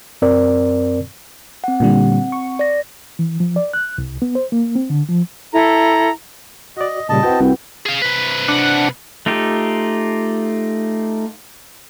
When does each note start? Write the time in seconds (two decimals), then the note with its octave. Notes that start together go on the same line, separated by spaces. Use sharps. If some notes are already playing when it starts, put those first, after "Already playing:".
0.22 F#2 C4 A#4 D5
1.64 C4 F#5
1.80 A#2 D3 G3
2.32 C#6
2.59 D5 A#6
3.19 E3
3.40 F3
3.56 D5
3.73 F#6
3.98 C2
4.22 B3
4.35 C5
4.52 A#3
4.75 C4
4.90 D3
5.08 F3
5.53 E4 A4 A#5
6.77 F#4 D5 D#5
7.09 A#2 C#3 G3 D#5 A5
7.23 C4 E4 F#4 B4 F#5 G5
7.40 C2
7.86 G#4 F5
8.02 C3 B4
8.48 D4 F#5
9.26 A3 D#4 F4 G4